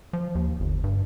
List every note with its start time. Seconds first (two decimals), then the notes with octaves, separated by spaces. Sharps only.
0.13 F3
0.35 D#2
0.60 G1
0.84 G2